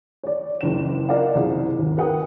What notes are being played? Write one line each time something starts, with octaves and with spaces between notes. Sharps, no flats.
C#5 D5
F#1 C#2 E7
F4 A#4 D5 D#5 F5 F#5
F#1 C2 G#4
G#1 D#2
F#4 A#4 B4 F#5 G5 D#6